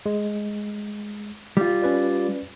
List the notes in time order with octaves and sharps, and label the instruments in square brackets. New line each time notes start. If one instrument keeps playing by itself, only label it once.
[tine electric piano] G#3
[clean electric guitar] G3 F4
[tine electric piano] C#4 B4 D5